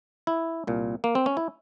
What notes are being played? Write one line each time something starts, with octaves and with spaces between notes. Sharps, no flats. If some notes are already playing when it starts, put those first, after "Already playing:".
E4
C2 A#2
A#3
C4
C#4
E4